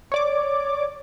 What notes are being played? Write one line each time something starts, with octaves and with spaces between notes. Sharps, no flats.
C#5 D5 D6